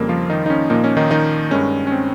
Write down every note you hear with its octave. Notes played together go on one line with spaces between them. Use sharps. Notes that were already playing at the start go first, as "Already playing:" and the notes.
Already playing: F2 C#3 G3 A#3 A#4
F3 F4
D#3 D#4
D#4
C#4
A#2 F3 A#3 D#4
C#4
D#3 D#4
D#3 D#4
G2 D#3 G#3 C#4
C#4
C4